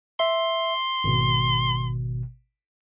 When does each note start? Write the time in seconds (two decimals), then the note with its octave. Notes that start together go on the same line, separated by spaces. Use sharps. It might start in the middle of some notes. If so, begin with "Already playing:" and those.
0.20 E5 C6
1.04 G#1 B2